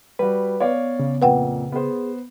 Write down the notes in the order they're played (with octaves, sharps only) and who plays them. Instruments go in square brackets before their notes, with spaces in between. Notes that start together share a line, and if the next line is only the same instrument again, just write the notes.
[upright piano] G3 F#4 [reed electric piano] B4
[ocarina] B3 [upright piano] C#5 D5 F5
[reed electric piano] C#3
[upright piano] F2 A#2 [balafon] B4 F#5 G5
[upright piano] B3 C5 [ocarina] G#4